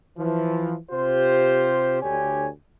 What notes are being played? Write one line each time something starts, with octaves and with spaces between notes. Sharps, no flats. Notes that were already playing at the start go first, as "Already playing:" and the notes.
E3 F3
C3 F4 G4 C5
D2 D3 G4 C#5 G#5